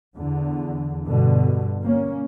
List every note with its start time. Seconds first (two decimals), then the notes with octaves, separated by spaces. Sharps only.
0.16 E2 D3
1.08 G2 B2 D3
1.82 A#3 C#4